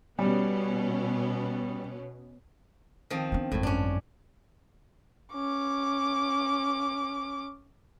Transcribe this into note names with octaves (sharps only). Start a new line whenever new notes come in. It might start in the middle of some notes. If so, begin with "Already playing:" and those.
B2 G3 B3 C#4
D#3 F3 C4
B3 D4
G#1 F#2 A2
C#4 D4
C#4 D6